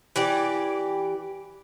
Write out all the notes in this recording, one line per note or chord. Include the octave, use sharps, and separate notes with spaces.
E3 G4 D5